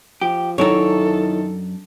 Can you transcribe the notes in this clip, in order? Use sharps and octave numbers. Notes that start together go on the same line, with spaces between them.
F3 G4
F#2 D#3 D4 E4 A4 C#5 A#5